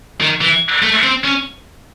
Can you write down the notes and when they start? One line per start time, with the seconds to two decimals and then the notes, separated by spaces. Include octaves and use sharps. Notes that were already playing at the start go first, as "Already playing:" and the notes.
0.21 D#3
0.41 E3
0.82 A3
1.03 C4
1.24 C#4